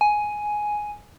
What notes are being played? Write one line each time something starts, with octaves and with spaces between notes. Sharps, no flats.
G#5